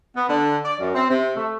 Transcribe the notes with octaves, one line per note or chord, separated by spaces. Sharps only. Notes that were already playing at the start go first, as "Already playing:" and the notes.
B3
D3
D5
F#2
C4
C3
A3